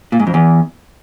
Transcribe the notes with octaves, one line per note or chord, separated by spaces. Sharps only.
A#2
G#2
F2
E2